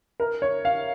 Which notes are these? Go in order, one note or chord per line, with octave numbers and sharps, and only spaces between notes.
A#4
C#5
F5